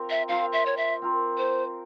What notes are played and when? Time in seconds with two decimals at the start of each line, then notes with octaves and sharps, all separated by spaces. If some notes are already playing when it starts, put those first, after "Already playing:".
Already playing: C4 F4 A#4
0.10 E5
0.29 C4 F4 A#4 F5
0.53 E5
0.66 C#5
0.77 E5
1.02 C4 F4 A#4
1.38 C5